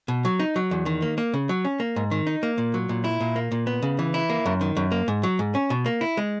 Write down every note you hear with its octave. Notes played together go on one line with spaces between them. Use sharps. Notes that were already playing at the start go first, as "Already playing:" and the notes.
B2
F#3
D#4
F#3
E2
D#3
A#3
A#3
C#3
F#3
C#4
A#3
G#2
D#3
D#4
A#3
A#2
F#3
A#2
E4
A#2
A#3
A#2
B3
C#3
E3
E4
A#3
F#2
D#3
F#2
A#3
G#2
F#3
G#2
C#4
B2
A#3
E4
G#3